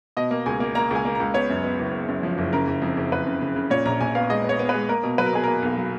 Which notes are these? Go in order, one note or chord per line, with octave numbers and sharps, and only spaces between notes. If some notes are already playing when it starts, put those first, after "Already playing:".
B2 D#5
A#3
C#2 G#5
A#3
A#3 A#5
C#2 G#5
A#3
C#2 A#5
B3 C#5
F#2
B3
F#1
B3
F#2
F3
F#1
C#3 A#4
F#1
F2
F#1
F#1 B4
C#3
C#3
C#3
A#2 C#5
A#1 A#5
A#1 G#5
B3 F5
G#3 D#5
B3
C#5
B3
B4
G#3
A#3 A#4
B2
F#3 B4
A#4
B2 G#4
A#3 A#4
B1
F#3